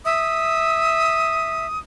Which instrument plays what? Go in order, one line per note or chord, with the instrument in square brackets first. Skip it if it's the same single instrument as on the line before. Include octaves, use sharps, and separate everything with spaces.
[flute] E5 [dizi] D#6